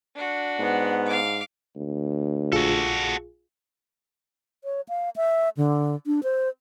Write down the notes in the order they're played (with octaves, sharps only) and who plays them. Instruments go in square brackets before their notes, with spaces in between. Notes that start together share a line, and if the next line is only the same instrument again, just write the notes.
[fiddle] D4 F#4
[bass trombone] G#2 [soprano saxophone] B3
[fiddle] F5 D6
[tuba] D2
[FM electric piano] A#1 F4 G#4 [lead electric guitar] F#4 A4
[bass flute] C#5
F5
E5
D3
D4
C5